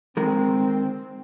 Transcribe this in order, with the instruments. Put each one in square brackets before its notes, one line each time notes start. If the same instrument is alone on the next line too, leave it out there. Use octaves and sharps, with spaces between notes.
[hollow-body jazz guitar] D#3 G#3 A#4 [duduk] C4